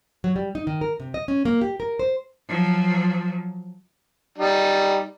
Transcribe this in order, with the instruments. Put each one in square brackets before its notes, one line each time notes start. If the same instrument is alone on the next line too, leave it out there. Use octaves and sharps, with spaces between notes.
[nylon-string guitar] F#3
G3
D#4
D#3
A#4
C3
D#5
C#4
A#3
G4
A#4
C5
[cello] F3 F#3
[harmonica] G3 D#4